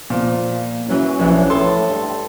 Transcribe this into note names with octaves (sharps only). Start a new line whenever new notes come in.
A#2 F3
E3 F#3 C#4
A#1 E3
A2 A4 C6
G2